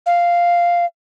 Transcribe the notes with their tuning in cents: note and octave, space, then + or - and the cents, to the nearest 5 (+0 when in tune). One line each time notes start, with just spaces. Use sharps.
F5 -5